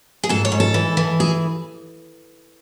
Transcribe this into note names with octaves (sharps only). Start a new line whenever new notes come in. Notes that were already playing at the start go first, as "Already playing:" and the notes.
G#4
G#2 A4
C#5
G#2
A4
E3
E3
G#4